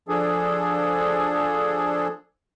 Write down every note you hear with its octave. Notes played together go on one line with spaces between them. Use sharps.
F3 D4 G#4 A4